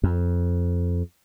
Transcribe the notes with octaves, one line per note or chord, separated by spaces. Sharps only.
F2